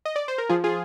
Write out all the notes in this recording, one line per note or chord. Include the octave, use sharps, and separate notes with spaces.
D#5
D5
C5
A#4
F3 F4 G#4
F4 G#4